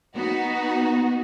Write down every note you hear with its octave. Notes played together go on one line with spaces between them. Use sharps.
B3 D#4 F#4